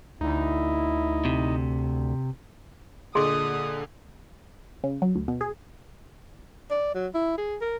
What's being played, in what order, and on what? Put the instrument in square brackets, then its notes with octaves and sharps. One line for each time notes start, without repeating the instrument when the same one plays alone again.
[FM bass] D2 [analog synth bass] D#4 [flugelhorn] E4
[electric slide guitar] C3
[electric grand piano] A#2 D3 [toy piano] G#4 D#5 C6 [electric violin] D#6
[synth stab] C#3
F#3
D2
B2
G#4
[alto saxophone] D5
F#3
E4
G#4
A#4